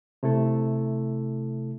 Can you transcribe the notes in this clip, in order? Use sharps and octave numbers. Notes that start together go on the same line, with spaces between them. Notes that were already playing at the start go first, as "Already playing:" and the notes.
C3 A3 E4 A4